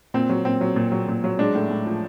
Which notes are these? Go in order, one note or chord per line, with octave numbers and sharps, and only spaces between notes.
A#2 C4
F#3
A#2 C4
F#3
A#2
F#3
A#2
F#3
G#3 D4
A2
A2
F3